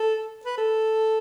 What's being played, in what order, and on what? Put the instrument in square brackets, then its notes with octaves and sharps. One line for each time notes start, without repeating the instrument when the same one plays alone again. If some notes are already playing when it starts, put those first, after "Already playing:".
Already playing: [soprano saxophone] A4
B4
A4